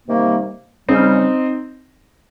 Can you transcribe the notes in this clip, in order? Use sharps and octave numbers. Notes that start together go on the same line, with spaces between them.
C3 D#3 G3 A#3
C#3 G3 C4 C#4 D#4